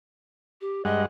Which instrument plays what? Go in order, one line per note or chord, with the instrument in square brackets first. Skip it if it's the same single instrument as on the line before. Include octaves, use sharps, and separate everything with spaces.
[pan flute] G4
[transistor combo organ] G2 G#3 F#5 [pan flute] D#5